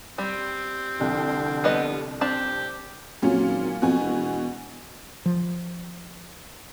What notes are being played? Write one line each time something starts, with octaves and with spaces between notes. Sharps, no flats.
G3 C4
C2 F2 D3
G3 B3 D#5
C4 D4 G4 A5
F2 A#2 F#3 C#4
G#1
F2 B2 G#5
E1
F3